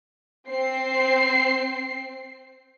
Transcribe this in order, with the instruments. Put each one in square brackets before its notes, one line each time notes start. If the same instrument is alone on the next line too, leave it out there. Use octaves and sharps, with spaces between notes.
[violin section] C4 C7